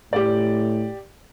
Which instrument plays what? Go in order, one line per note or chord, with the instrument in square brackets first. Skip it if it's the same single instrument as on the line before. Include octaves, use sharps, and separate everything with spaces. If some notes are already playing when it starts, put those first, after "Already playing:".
[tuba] A2 [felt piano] G4 D5